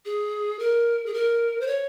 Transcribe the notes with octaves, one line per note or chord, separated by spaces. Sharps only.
G#4
A#4
G#4
A#4
C5
C#5